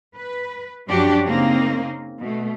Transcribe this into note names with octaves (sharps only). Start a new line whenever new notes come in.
B4
F#2 F3 D4 F#4 G4
C#3 A#3 C4 D#4
B2 A3